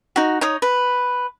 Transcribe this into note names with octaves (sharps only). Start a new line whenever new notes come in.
D#4 F#4
D#4 C#5 D#6
B4